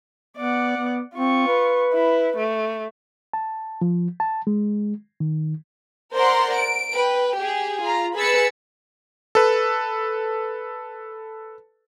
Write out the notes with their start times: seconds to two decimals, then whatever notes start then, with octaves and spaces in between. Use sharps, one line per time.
0.37 B3 D5 F#5
0.77 B3
1.15 C4 F4 C#6
1.47 B4
1.93 E4
2.37 A3
3.33 A5
3.81 F3
4.20 A5
4.47 G#3
5.20 D#3
6.13 A#4 C5 D5 F#5 A#5 C6
6.54 D7
6.93 B4 G5
7.37 G4 G#4
7.83 F4 A#5
8.15 G#4 B4 B5 E6 A6 C#7
9.35 A4 B4